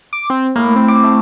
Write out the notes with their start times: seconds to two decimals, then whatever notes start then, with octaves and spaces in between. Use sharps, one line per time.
0.13 D6
0.30 C4
0.56 A2 A#3
0.76 C4
0.88 D6
1.03 A3